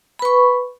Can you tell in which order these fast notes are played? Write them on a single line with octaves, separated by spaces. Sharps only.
B5 B4 C#6